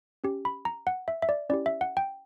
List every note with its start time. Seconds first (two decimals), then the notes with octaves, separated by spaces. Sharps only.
0.24 C#4 G4
0.45 B5
0.65 A#5
0.87 F#5
1.08 E5
1.22 E5
1.29 D5
1.50 C#4 E4 G4 D5
1.66 E5
1.81 F#5
1.97 G5